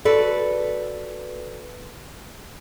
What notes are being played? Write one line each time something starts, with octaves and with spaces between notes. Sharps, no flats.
F#4 A4 B4 D5